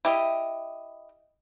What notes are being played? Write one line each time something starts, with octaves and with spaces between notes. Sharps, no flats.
E4 G4 D#5